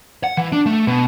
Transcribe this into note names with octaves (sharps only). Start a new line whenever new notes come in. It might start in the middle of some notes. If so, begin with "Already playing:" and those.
F#5
E3
D4
A3
B2